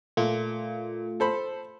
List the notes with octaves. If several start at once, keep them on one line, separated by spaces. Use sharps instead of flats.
A#2 A3 F4
A4 C5 B5